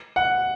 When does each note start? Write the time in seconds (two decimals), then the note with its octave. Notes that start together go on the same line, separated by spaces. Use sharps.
0.16 F#5